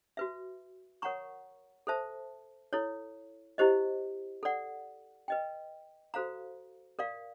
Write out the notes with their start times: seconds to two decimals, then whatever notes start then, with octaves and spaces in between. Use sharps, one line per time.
0.17 F#4 B4 E5
1.02 A#4 C#5 F#5 A#5 C#6
1.87 A4 C5 E5 A5
2.73 E4 A4 C#5
3.58 E4 G4 C5 D#5
4.43 A4 D5 F#5
5.28 B4 D#5 G5
6.14 F#4 A4 C5 F5 A#5
6.99 A#4 D5 F5